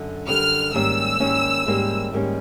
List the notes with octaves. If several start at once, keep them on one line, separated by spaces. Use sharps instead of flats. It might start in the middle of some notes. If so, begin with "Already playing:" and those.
Already playing: F#2 D3
F#2 D3 G3 F6
G#2 D#3 G3 A#3 C#4 E6
G#2 D#3 G3 A#3 C#4
G#2 D#3 G3 A#3 C#4
G#2 D#3 G3 A#3 C#4